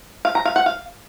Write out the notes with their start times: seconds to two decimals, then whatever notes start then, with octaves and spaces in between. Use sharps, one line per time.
0.25 F5
0.35 A#5
0.45 F5
0.56 F#5
0.66 F5